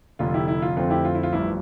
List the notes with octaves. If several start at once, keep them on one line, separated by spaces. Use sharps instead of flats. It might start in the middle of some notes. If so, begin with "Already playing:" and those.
F1 F2 D3 F4
E4 G4
E4
F4
F2 D3 A3 C4 F4
E4 G4
F4
E4
F4
A1 G2 F3 E4